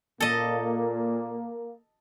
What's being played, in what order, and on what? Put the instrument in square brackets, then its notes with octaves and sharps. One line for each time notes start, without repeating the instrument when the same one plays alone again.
[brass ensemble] A#2 [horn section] A#3 [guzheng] A4 D#5